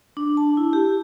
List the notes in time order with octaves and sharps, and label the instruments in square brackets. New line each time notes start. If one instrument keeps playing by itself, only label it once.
[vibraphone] D4
A5
E4
G4